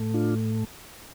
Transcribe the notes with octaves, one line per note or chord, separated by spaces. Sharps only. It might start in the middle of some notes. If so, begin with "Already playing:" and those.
Already playing: A2 A3
D4 F4